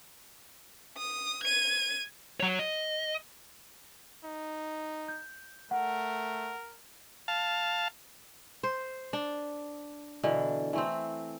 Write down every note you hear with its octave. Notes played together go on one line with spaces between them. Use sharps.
D#6
G#6 D#7
F#3 C#5
D#5
D#4
G6
A3 A#4 F#5
F5 A5
C5
D4
B2 D3 E3
E3 A3 C4